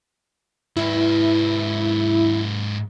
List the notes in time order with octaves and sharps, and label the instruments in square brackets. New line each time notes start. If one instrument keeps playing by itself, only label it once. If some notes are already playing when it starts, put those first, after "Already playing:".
[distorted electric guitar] G#2 B4 [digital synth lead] E4